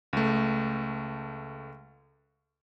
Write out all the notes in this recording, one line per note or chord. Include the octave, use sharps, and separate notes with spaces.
C#2 A3